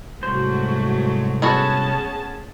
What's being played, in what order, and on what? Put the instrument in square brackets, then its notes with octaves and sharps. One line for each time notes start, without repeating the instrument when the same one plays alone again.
[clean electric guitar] C2 C5 [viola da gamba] G#2 F#3 A3 [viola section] F#4
[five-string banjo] B3 F#4 A4 [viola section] C#4 G#4 A5